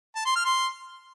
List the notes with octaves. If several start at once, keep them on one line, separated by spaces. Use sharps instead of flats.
A5
C6
F6
C6